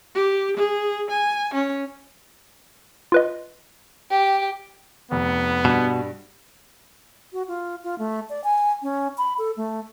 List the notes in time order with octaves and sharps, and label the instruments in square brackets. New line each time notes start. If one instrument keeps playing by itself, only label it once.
[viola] G4
G#4
G#5
C#4
[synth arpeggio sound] F4 B4 D#5
[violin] G4
[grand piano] F1 [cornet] B3
[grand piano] G2 [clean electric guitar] B2
[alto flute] F#4
F4
F4
A3
D5
G#5
C#4
B5
A4
A3